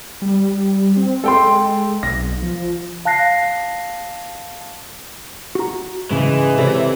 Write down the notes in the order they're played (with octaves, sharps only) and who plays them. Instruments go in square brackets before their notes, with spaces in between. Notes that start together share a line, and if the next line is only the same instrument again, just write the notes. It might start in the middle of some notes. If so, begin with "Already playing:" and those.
[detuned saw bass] G3
C4
[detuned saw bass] G#3 [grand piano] A4 G5 C6
[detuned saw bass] B1 [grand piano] A#6
[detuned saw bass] F3
[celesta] F5 A5 F#6 A#6 C7
[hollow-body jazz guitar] F#4 A#5
[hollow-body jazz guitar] G#2 C#3 [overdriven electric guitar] E3 [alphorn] G#3
[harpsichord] C3 [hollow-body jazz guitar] A4 C#5 D5